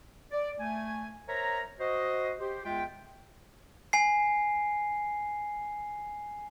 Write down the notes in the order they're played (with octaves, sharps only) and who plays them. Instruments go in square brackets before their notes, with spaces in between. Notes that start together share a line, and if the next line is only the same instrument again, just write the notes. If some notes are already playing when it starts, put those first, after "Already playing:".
[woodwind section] D5
A3 G#5
A#4 C5 C#5 E5 A#5
F#4 C5 D#5
G4 C5
E2 G#3 F4 E5 G5
[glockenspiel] G#5 C7